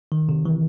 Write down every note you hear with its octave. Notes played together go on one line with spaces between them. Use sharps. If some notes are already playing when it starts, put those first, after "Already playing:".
D#3
C3
E3